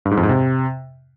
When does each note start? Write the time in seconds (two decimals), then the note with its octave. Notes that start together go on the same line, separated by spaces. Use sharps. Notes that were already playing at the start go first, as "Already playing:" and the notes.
0.05 G2
0.11 G#2
0.17 F2
0.23 G#2
0.29 C3